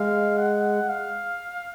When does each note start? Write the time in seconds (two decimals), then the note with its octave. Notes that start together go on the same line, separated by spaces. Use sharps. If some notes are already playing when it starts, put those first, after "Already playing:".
Already playing: G#3 F5
0.38 F#5
0.89 F5